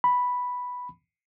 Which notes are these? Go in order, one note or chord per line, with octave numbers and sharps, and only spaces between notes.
B5